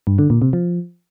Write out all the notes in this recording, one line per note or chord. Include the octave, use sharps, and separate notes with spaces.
G2
D3
A#2
C3
F3